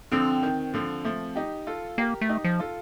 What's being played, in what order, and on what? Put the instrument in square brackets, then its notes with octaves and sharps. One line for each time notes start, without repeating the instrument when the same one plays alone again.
[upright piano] D3 F3 [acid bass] C4
[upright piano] D#3
D3 F3
F3 A3
D#4 G4
F4 A4
[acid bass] A#3 [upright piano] G4 A#4
[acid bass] A3
[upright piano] D#4 G4
[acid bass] F3
[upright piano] F4 A4